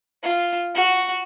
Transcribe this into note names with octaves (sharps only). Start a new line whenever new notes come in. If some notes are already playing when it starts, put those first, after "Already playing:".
F4
F#4